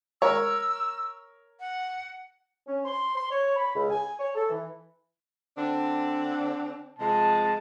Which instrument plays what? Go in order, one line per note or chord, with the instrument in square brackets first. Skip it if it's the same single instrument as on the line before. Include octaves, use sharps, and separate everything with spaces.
[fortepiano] A#4 C#5 [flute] E6
[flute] F#5
[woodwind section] C#4
C6
C6
C#5
B5
C#2
G#5
C#5
A4
E3
[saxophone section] D3 C4 D4
[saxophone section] C3 F3 G#3 [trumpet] A5